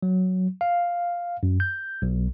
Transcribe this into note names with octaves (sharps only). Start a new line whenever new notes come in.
F#3
F5
F#2
G6
B1